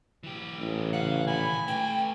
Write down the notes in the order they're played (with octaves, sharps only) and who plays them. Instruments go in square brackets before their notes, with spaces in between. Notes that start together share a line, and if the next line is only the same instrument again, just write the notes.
[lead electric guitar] E3 G4
[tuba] A1
[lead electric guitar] C#3 [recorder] F5 [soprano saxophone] F#5
[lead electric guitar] A#2 D#3 [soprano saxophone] G#5 [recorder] B5
[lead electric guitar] A3 B4 [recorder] G5